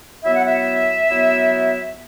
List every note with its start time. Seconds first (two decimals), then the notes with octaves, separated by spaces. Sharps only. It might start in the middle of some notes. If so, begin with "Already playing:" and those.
0.25 F#3 B3 E4 E5
0.36 F#5
0.47 E5
1.11 F#3 B3 E4